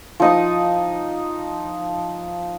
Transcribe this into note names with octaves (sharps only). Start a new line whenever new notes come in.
F3 D#4 D#6